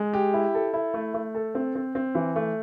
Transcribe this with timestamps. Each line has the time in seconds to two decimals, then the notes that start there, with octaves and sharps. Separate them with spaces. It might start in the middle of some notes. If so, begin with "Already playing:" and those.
Already playing: G#3
0.13 G4
0.34 E4
0.54 A4
0.73 E4
0.94 A3
1.14 A3
1.35 A4
1.55 C4
1.75 C4
1.95 C4
2.15 E3
2.36 A3